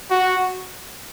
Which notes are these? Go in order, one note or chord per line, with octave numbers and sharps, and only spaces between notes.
F#4